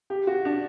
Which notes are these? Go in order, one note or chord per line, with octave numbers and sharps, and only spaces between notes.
G4
F#4
D4